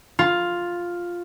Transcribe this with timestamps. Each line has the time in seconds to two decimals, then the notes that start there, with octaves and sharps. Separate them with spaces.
0.19 F4